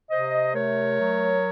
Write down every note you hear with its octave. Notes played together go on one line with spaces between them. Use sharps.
C3 C5 D#5
A3 A#4 C#5
F#3